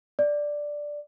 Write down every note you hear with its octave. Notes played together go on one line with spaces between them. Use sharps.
D5